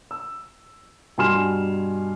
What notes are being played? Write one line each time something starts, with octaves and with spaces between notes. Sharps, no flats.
E6
G2 B2 G#5 C6 F6 E7